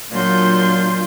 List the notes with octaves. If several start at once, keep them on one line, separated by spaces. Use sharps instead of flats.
A#2 F#3 D4 F4 C6 G6